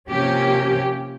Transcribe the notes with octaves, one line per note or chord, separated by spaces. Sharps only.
C3 F3 A#3 C#4 G4